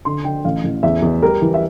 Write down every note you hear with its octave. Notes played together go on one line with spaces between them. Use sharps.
D3 C6
D3 G5
A1 F5
A1
E2 E5
E2
G3 A#4
E3
E5